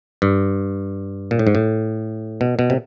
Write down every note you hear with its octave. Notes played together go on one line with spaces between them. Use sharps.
G2
A#2
A2
G#2
A2
B2
B2
C3